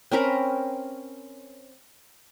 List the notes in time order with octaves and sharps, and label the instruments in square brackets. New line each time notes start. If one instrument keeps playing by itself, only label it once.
[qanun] C4 C#4 A#4 B5